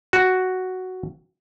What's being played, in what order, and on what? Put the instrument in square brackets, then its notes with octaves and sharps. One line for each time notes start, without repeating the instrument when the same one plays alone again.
[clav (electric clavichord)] F#4